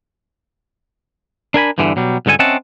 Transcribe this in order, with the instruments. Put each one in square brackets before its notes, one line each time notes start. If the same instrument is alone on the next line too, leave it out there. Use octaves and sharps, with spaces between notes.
[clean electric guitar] D4 A#4 G#5 B5
E2 G2 D3 E3
B2 F#3 G3
C#2 G2 D3 A4 G#5
C4 C#4 D#5 E5 F#5 A5